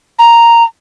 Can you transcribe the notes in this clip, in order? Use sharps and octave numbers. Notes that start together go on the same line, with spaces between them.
A#5